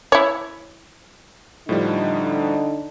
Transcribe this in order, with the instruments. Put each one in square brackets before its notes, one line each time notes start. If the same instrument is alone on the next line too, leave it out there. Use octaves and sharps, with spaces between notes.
[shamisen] E4 C#5
[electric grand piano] A2 F3 G3 [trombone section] D3 D#4